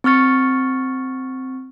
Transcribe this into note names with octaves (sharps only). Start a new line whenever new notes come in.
C4 C#6 F6 A6 C#7